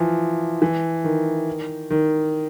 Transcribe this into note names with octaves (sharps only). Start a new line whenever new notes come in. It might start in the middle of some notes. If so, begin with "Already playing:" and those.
Already playing: E3 F3
E3
D#3
D#3